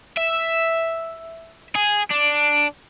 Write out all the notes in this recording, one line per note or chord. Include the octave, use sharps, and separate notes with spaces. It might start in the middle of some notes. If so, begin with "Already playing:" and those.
E5
G#4
D4